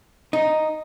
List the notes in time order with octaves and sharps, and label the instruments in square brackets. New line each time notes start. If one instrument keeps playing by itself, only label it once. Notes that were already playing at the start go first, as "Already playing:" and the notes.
[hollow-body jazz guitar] D#4